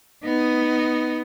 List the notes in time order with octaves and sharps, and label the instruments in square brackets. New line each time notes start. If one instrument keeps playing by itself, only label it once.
[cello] B3 D#4